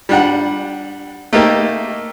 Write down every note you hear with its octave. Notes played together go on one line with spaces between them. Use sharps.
G3 D4 F#5
A3 A#3 D#4 G4 A#4